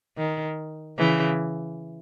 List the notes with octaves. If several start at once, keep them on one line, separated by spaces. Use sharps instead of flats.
D#3
C#3 E3